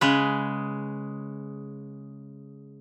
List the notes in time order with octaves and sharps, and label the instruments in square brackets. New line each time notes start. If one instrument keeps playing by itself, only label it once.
[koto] C#3 G#3 B4